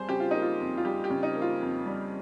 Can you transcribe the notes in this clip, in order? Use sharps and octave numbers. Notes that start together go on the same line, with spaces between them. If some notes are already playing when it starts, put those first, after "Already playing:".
Already playing: F2 G3 G#4 C5
C#3 G4
F4
A#3 D#4
F4
F2
F4
G3 G4
G4
C#3
D#4
A#3
F4
F2
G3